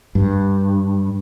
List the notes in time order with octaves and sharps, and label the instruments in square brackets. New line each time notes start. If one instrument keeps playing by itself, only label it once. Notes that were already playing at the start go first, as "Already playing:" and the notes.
[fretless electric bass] G2